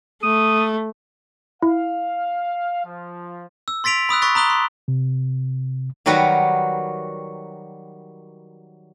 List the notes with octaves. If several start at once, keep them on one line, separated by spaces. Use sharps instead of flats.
A3 D#6
E4 F5
F3
E6
C6 A6 B6 D7 F7
B5 D#6 E6 F#6
B5 C#6 E6 F#6 A6 B6
A#5 B5 D#6 F#6 G7
C6
C3
D#3 F#3 G3 F#4 A#4 B4